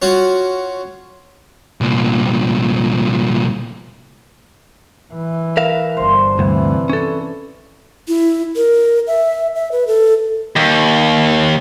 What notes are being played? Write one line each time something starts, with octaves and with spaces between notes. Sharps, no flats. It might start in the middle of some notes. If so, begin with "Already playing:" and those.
C#4 F4 F#4
C2 A#2
E3
A#4 E5 F5
G1 D4 C5
D2 G2 C3 E3 B4
C#4 A4
E4
A#4
E5
E5
B4
A4
D#2